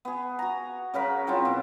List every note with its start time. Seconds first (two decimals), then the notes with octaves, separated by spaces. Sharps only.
0.05 B3 G#4
0.39 F#4 A#5
0.94 C#3 F#3 A#4 B5
1.27 F#3 C4 E4 F4
1.45 B2